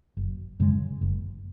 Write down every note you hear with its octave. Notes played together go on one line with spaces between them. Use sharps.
F#1
F#2 C#3 G#3
F#1